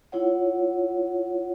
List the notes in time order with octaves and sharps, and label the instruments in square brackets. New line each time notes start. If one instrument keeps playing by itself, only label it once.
[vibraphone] E4 F4 C#5 F#5